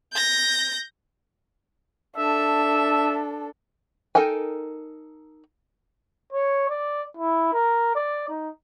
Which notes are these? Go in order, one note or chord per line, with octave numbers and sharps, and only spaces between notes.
G6 A#6
D4 A4 E5
D#4 A4 A#4 G5 G#5
C#5
D5
E4
A#4
D5
D#4